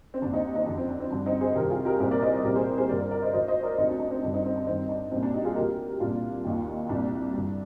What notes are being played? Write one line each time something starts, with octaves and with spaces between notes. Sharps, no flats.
C4
D#2 D3 D4
C4 D#4
C4 D#4
F2 D3 D4
C4
D4
C4
G2 D3 D4
C4 D#4
G#4 C5
C2 C3 D#3 G4 A#4
F4 G#4
G4 A#4
C2 A#2 G#4 C5
A#4 D5
C5 D#5
C2 A#2 G4 A#4
G#4 C5
G#4 C5
G2 D3 A#4 D5
A#4 D5
A#4 D5
C5 D#5
D2 D3 C5 D#5
C5 D#5
A#4 D5
D2 D3 C4 D#4
D4
D4
C4
G2 D3 D4
C4 D#4
C4 D#4
D4
G2 D#3 C4 D#4
D4
C2 A#2 C4
D4
D#4 G4
F4 G#4
D2 D3 G4 A#4
C2 A#2 D4 F4
D#2 D#3
C2 A#2 D4
G2 D3